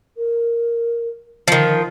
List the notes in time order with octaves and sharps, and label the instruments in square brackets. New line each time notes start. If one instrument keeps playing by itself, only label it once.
[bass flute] A#4
[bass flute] D3 [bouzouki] D#3 F3